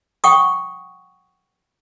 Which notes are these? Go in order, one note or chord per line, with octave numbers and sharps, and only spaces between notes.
F#5 G5 C#6 D#6